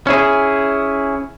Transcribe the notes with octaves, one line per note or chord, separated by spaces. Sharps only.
C#4 E4 G#4